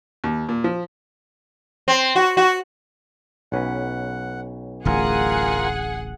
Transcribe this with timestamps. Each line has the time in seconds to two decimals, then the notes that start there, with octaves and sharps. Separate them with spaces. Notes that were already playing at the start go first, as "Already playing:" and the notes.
0.24 D#2
0.49 A#2
0.64 F3
1.88 C4
2.16 F#4
2.37 F#4
3.52 B1 C#4 B4 F#5
4.85 D1 A1 F4 G#4 A#4 F#5